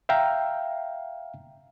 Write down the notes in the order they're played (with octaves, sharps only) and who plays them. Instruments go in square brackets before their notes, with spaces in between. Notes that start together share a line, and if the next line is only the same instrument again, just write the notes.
[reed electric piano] E5 F5 G5 A#5